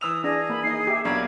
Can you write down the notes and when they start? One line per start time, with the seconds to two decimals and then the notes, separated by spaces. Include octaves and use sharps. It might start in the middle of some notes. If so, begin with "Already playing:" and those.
0.01 E3 D#6 E6 F7
0.24 D4 G#4 A#6
0.50 A#3 B5
0.64 D#4 D#5 C7
0.87 G4 E5
1.05 B1 A#3 D4 B5 G#6